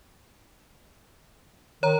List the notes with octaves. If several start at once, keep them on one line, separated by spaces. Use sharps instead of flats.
D#3 C#5 A#5